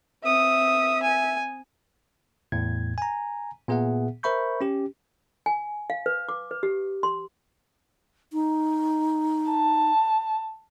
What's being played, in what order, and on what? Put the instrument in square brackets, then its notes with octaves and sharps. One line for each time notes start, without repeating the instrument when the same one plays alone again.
[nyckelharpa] C4 D#6 [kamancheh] E5
[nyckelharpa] G#5
[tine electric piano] E2 A2 G#6
G#5 A#5
A#2 B3 G#4 E5 F#5
A#4 C5 E5 B5 C#6 G6
C#4 G4
[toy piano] G#5
F5
B4
D6
B4
G4
C6
[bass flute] D#4
[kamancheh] A5